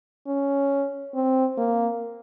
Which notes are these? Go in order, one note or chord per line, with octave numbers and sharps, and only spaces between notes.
C#4
C4
A#3